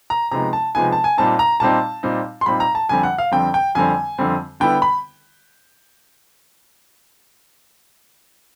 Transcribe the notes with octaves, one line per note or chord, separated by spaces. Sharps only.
A#5
C3 F3 G#3 B3 D#4 A#5
A5
C3 F3 G#3 B3 D#4 G#5
A5
G#5
A#2 G3 C4 D#4 A5
A#5
A#2 G3 C4 D#4 A5
A#2 G3 C4 D#4
C6
A#2 G3 C4 D#4 B5
A#5
A5
F2 D3 G3 C4 G#5
F#5
F5
F2 D3 G3 C4 G5
G5
F2 D3 G3 C4 G#5
F2 D3 G3 C4
D3 G3 B3 E4 G5
B5